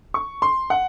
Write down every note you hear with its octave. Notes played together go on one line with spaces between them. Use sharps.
C#6
C6
F#5